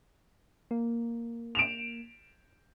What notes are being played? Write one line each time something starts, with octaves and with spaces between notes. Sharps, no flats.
A#3
D7 E7 F7